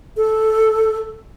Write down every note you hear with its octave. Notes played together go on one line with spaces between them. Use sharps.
A4